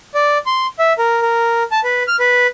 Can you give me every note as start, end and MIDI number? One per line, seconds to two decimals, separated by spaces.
0.15 0.38 74
0.46 0.67 84
0.79 0.93 76
0.98 1.21 70
1.22 1.63 70
1.71 1.80 81
1.84 2.03 71
2.08 2.16 89
2.20 2.47 71